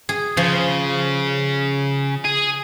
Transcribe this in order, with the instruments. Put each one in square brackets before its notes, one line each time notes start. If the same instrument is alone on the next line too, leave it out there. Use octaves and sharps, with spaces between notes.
[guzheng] G#4
[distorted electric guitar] C#3 [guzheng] F3
[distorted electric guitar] G#4